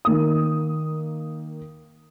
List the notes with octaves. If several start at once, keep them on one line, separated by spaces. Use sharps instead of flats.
D#3 A#3 D#6